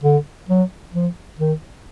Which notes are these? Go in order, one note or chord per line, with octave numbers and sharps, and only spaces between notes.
D3
F#3
F3
D#3